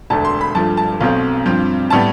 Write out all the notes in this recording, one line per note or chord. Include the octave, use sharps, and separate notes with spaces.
E1 D2 D3 A3 A5
C6
B5
G2 F3 A3 A5
A5
B1 B2 A3 C4 F5
G2 F3 C4
A2 G3 B3 A5